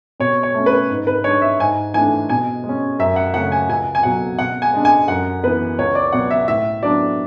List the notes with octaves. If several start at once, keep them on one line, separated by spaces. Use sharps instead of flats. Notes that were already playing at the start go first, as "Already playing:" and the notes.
B2 C#5
C#5
A3 C#4
B4
G#2
B4
G#3 D4 C#5
E5
G#2 G#5
E3 A3 D4 G#5
B2 G#5
G#3
C#4
F#2 E5
F#5
C#3 F#3 A3 C#4 F#5
G#5
C#2 G#5
G#5
B2 F#3 F#5
B2 F#5
G#5
G#3 D4
G#5
F#2 F#5
E3 B3 B4
C#2 C#5
D5
B2 F#3 B3 F#5
E5
A2 E5
F#3 B3 D4 D5